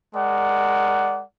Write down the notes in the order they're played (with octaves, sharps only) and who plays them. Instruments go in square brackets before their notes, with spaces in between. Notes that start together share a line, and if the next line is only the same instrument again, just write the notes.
[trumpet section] G#3 A#4 D5 F#5